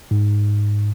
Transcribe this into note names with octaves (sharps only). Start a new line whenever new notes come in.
G#2